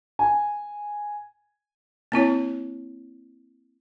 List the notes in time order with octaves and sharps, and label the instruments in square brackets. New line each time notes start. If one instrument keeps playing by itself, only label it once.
[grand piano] G#5
[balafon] A#3 C4 E4 C#5